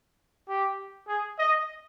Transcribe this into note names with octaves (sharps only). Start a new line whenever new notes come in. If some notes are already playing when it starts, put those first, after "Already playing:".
G4
G#4
D#5